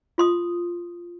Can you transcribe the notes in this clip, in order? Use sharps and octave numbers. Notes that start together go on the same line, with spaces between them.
F4 C6 D#6